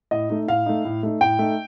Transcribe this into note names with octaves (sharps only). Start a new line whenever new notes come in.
A2 D#5
A3 D#4
A2 F5
A3 D#4
A2
A3 D#4
A2 G5
A3 D#4